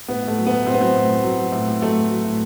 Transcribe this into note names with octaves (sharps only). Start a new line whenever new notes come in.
A2 B3
A2
A3
F#3
A2 B3
A2 C4
B3
F#3 C4
A2
A2
F#3
F#3
A2
A2
F#3 A3
A2
F#3
A2